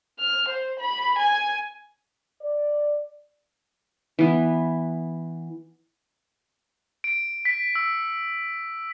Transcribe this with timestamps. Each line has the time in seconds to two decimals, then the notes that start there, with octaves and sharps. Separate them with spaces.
0.19 F6
0.48 C5
0.80 B5
1.18 G#5
2.41 D5
4.19 E3 B3
7.04 D7
7.45 B6
7.75 E6